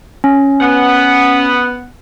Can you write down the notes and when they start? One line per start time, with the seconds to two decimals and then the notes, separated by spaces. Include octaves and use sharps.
0.24 C#4
0.61 B3 F#5